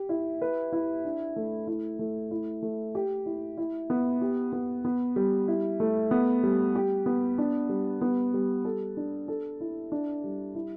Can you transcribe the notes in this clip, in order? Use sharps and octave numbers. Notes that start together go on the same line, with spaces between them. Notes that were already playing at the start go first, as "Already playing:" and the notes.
Already playing: G4
E4
B4
E4
D4
A3
E4
A3
E4
A3
G4
E4
E4
B3
G4
B3
B3
G3
E4
A3
B3
G3
G4
B3
D4
G3
B3
G3
A4
D4
A4
E4
D4
G3
E4